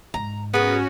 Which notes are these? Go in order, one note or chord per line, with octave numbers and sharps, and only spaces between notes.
G#2 A#5
B3 C#4 F#4 G#4 A#4